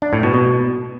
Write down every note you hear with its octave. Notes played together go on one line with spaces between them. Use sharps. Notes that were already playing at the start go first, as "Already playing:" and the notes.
D4
A2
B2
B2